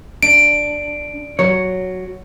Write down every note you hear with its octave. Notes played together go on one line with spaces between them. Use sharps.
D4 D7
F#3 C#5